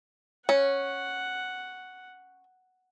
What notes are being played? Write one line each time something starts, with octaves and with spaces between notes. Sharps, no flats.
C#4 C#5 F#5